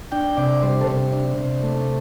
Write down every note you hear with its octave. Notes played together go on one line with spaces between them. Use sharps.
D4 G5
C3 D5
G3 C5
A4
C3 C5
D4
C3
A3